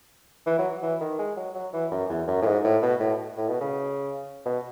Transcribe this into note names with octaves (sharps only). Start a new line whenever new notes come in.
E3
F#3
E3
D#3
G#3
F#3
F#3
E3
F#2
E2
F#2
A2
G#2
A2
B2
A2
A2
B2
C#3
B2